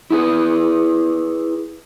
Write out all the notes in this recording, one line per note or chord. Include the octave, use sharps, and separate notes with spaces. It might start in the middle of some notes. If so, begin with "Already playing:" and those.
E4 G#4 B4